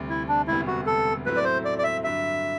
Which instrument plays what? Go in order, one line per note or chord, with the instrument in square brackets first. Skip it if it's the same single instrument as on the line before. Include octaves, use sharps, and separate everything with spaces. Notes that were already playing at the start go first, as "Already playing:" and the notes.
Already playing: [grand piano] D2 C3 G3
[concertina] E4
D4
[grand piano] E1 D2 C3 G3 B3 [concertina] E4
[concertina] F#4
A4
[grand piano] A2 F#3 A3 C4 E4 [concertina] B4
[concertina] D5
C5
D5
D5
E5
[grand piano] G2 D3 F#3 [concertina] E5